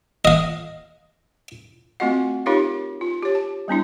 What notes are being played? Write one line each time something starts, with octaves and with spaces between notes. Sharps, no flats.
D#5 F5
A3 C4 F4 F#4 D#5 F#5
D#4 F4 G4 A#4 C#5 F5
F4
G4 C#5
A5
G3 B3 D4 E4